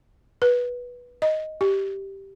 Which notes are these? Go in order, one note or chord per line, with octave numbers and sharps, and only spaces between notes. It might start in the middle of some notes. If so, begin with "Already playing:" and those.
B4
D#5
G4